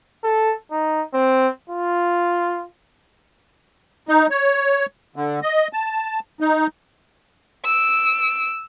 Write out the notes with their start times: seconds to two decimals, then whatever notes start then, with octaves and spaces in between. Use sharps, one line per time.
0.24 A4
0.71 D#4
1.14 C4
1.70 F4
4.08 D#4
4.30 C#5
5.16 D3
5.43 D#5
5.73 A5
6.40 D#4
7.65 E6 D7